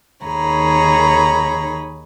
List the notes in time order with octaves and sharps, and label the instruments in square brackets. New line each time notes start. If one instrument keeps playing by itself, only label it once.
[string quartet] D#2 D#3 G#4 C#5 A#5 B5